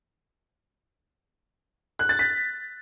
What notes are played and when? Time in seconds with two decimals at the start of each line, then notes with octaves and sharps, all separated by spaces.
1.99 F#6
2.09 A6
2.19 B6